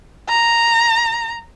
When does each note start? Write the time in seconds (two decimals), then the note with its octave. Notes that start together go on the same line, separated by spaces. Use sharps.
0.29 A#5